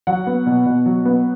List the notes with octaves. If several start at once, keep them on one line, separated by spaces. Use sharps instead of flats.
F#3 F#5
B3
B2
B2
F#3
B3